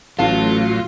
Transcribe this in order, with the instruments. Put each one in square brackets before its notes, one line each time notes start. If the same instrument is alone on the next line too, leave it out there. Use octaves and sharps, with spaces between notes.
[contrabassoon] A1 [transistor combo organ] A2 F#3 [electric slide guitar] F4 [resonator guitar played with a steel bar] F5 A5